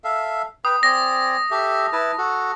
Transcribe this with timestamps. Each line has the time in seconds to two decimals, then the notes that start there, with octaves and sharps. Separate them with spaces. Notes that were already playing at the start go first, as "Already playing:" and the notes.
0.04 A4 E5 F5
0.65 B4 G5 D#6
0.83 C4 G#4 D5 A#6
1.51 G4 A4 E5
1.92 E4 B4 A5
2.18 F#4 A4